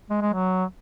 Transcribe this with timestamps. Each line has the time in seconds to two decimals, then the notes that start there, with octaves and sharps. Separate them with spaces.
0.10 G#3
0.22 G#3
0.34 F#3